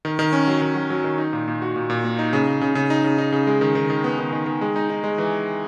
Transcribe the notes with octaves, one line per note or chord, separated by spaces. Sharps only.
D#3
D#3
C#4
F#3
D#3
F#3
F#3
D#3
D#4
A#2
A#2
F#4
A#2
A#2
A#3
D#4
C#3
C#3
C#3
C#3
D#4
C#3
D#4
C#3
G#3
D#3
D#3
D#3
B3
D#3
D#3
D#3
G#3
D#4
D#4
G#3
E3